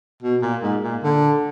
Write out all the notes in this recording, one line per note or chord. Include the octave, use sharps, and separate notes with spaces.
B2
A#2
G#2
A#2
D3